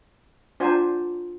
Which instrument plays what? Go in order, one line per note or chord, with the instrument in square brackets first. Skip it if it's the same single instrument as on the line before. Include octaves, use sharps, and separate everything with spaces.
[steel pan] D4 C5 G#5 [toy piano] F4 F#5 A#5